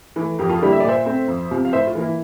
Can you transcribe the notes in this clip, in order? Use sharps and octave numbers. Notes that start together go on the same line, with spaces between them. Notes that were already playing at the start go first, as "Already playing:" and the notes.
E3 A3
F2 G4 A#4
F4 A4
D3 G3 A#3 E4 G4
E5
D5
A#2 C5 E5
A3 C4
F2
C3 F3
F5
A2 C5 E5
F4
E3 A#3
E4